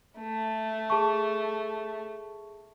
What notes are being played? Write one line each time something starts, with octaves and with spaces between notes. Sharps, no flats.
A3
G#4 A5 C#6